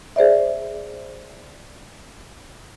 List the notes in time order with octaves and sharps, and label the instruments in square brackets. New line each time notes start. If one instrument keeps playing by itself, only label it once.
[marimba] G#4 C5 D5 E5